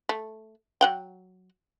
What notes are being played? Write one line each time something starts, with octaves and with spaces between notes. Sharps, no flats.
A3
F#3 F#5 G5